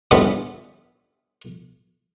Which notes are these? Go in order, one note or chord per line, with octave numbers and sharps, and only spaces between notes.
D3 E3 G3 B3 C#4 F4